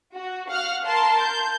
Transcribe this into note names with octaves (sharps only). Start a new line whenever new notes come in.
F#4
F5 F#5 F6
A#4 A5 C6
G6